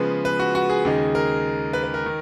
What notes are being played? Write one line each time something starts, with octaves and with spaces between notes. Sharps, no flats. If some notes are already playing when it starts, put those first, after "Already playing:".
Already playing: C#3 F3 G#3 B3 B4
B4
F#4
F#4
G#4
D#2 C#3 G#3 D#4
A#4
B4
B4
A#4
D#3